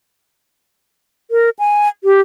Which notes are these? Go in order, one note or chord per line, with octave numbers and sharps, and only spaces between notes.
A#4
G#5
G4